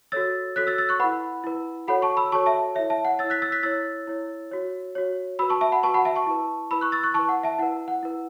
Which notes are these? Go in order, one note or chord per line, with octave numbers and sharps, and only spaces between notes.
F#4 A4 C#5 E6 A6
F#4 A4 C#5 F#6 B6
E6 A6
E6 A6
C#6 F#6
E4 B4 F#5 B5
E4 B4
F#4 A4 C#5 F#5 B5
A5 C#6
B5 E6
F#4 A4 C#5 A5 C#6
E5 A5
E4 C#5 E5
E5 A5
F#5
E4 C#5 E6 A6
F#6 B6
E6 A6
F#6 B6
E4 C#5 E6 A6
E4 C#5
F#4 C#5
F#4 C#5
F#4 B4 B5 E6
A5 C#6
E5 A5
F#5 B5
F#4 B4 A5 C#6
F#5 B5
E5 A5
A5 C#6
E4 B4
E4 B4 B5 E6
C#6 F#6
E6 A6
C#6 F#6
E4 B4 A5 C#6
F#5
E5 A5
E4 B4 F#5
F#5
E4 B4